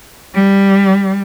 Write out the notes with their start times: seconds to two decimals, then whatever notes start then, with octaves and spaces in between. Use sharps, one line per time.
0.35 G3